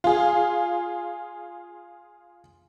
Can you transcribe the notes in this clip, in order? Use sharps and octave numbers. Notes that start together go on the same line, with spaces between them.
F4 G#4